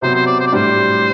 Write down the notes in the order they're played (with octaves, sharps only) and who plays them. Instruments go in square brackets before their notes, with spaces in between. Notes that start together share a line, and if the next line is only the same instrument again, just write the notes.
[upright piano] C3 F#3 B3 [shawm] C5
[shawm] C5
D5
C5
D5
[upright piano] A2 G3 D4 [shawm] C5